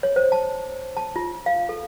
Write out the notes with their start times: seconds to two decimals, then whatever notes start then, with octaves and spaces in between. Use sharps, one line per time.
0.03 C#5
0.16 C5
0.32 A5
0.97 A5
1.16 F4
1.46 F5
1.69 A4